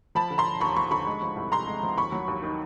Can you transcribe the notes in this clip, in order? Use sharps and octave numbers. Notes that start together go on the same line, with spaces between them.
F3 A5 B5
D3
A#5 C6
E1
D#2 B5 C#6
F3 B5 C#6
D3 B5 C#6
G#3
F3
C2
C3 A#5 C6
G#3
F3
D#2 B5 C#6
F#3
D#2
D#3